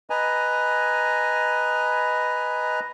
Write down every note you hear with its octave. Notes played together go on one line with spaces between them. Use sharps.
B4 D#5 G#5 A#5